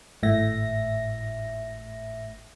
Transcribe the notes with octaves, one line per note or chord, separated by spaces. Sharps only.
G#1 A2 E5 A#6